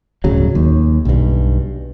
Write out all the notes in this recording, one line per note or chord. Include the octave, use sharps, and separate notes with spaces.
D1 G1 C#3 F#3
D#2
B1 G2